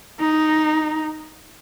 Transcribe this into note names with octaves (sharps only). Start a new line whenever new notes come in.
D#4